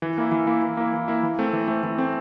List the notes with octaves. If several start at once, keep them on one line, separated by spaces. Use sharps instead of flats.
E3
A#3 E4
E3
A#3 E4
E3
A#3 E4
E3
A#3 E4
E3
A3 C4
E3
A3 C4
E3
A3 C4